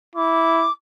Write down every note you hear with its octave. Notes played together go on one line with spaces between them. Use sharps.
E4 D6